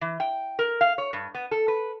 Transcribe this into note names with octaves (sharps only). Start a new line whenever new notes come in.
E3
G5
A#4
F5
C#5
G2
B3
A4
B4